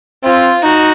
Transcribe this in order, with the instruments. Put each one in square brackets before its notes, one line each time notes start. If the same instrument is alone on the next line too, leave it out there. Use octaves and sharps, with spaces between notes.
[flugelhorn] C4 [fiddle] F4
[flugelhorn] D#4 [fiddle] F#4